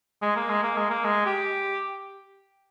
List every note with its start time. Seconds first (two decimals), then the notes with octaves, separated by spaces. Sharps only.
0.22 G#3
0.36 A#3
0.49 G#3
0.63 A#3
0.77 G#3
0.90 A#3
1.04 G#3
1.26 G4